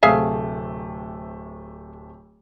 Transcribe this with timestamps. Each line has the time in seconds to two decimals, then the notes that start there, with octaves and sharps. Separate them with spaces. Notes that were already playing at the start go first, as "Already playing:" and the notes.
0.03 D1 C3 A3 G#4 E5 F5